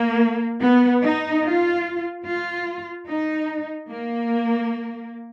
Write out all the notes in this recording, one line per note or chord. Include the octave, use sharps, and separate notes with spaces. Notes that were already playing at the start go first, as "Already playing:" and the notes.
Already playing: A#3
B3
D#4
F4
F4
D#4
A#3